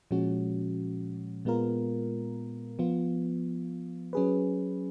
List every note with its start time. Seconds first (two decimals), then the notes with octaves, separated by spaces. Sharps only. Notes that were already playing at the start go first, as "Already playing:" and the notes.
0.11 A#2 F3 G#3 C#4 F#4
1.45 A#2 G#3 B3 F4 A#4
2.79 F3 B3 F4
4.13 F#3 C#4 G#4 B4